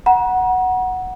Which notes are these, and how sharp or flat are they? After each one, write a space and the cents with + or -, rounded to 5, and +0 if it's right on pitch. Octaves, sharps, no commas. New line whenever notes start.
F#5 +0 A#5 +40